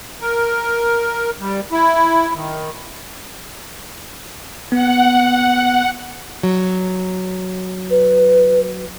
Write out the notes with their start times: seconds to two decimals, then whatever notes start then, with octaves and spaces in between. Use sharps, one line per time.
0.21 A#4
1.39 G3
1.72 E4
2.34 D#3
4.72 B3 F#5
6.43 F#3
7.90 B4